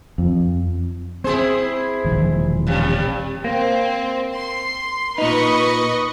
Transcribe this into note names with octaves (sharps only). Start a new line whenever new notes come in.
F2
C4 E4 G#4 C5
E1 A#1 D#3
G2 C3
A#3 C4
C6
A#2 D#4 B4 D#5 C#6